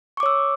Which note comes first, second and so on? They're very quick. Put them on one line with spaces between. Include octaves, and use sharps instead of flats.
C#6 D6 C#5 E6